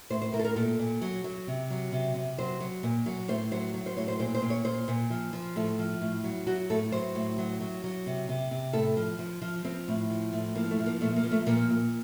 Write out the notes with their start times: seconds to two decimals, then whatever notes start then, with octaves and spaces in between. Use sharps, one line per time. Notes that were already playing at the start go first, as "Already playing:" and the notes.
0.10 A2 C5
0.22 C5
0.33 A2 A#4
0.39 A4
0.45 A#4
0.56 A#2 A4
0.79 A#2
1.02 F#3
1.24 F#3
1.47 C3
1.70 F#3
1.92 C3
2.15 C3
2.38 F#3 C5
2.60 F#3
2.83 A#2
3.06 F#3
3.28 A2 C5
3.52 F#3 C5
3.74 F#3
3.86 C5
3.97 A2 C#5
4.08 C5
4.20 A#2 C5
4.35 C5
4.42 A#2
4.50 C#5
4.65 A#2 C5
4.88 A#2
5.10 F3
5.33 F3
5.56 A2 A4
5.79 F3
6.01 A2
6.24 F#3
6.47 F#3 F#4
6.70 A2 A4
6.92 F#3 C5
7.15 A2
7.38 F#3
7.60 F#3
7.84 F#3
8.06 C3
8.29 C3
8.51 C3
8.73 A2 A4
8.97 F3
9.19 F3
9.42 F3
9.64 F3 C4
9.88 A2
10.10 F3
10.33 A2
10.55 F3 A#3
10.71 A3
10.79 F3
10.86 A#3
11.01 A#2 A3
11.16 A#3
11.23 F3
11.32 A3
11.46 A#2 A#3
11.70 A#2